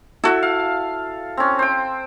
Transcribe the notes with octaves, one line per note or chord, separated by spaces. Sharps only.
E4 F#4 A4
F5
C4 C#4
C5 G5